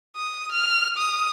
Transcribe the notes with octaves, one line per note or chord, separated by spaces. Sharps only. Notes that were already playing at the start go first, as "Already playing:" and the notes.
D#6
F6
D#6